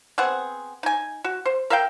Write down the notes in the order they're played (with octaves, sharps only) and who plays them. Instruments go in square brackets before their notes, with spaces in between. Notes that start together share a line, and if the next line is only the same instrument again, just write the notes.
[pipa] B3 C4 G#4 F#5
D#4 G#5
F#4
C5
A#4 E5 F5 G5